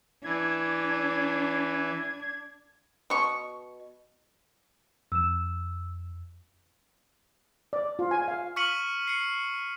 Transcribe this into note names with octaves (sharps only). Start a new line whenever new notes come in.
E3 D4 G#6
B2 C#6
F2 E6 E7
D5
F4
G#5
F5
C#6 F6 B6 C#7 D#7 F#7
C7 C#7